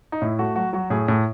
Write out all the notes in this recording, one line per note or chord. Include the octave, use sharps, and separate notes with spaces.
D#4
A2 E4
A3 F#4
F#3 F#4
F#3 F#4
A2 G#4
A2